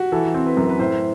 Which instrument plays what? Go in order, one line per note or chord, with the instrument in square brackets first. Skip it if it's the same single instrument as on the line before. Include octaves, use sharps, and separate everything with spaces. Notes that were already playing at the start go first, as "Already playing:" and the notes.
Already playing: [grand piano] F#4 G4
[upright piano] E3 [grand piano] A4
[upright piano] C4
[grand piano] B4
[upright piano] F#2
[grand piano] B4
[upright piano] A2 [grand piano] C5